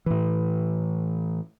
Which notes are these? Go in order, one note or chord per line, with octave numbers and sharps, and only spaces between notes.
A2 E3